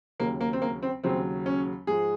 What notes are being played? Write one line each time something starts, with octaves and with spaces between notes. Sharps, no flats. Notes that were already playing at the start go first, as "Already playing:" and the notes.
D#2 C#3 F#3 A#3
A#3
C4
A#3
C4
D#2 C#3 F#3 C4
C#4
G#2 F3 G#3 G#4